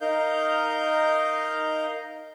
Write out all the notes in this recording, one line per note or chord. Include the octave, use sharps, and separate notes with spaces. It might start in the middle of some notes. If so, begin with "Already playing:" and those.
D#4 A#4 D#5 F5 G6